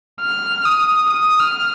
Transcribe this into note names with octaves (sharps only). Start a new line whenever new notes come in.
F6
D#6
D#6
F6